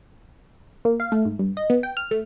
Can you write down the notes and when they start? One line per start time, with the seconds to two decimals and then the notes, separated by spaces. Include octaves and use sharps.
0.85 A#3
1.00 F5
1.12 A3
1.25 G#2
1.39 G2
1.57 D#5
1.70 B3
1.83 G5
1.97 F6
2.11 A3